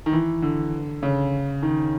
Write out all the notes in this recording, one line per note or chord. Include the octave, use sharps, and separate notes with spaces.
D#3
E3
D3
C#3
D#3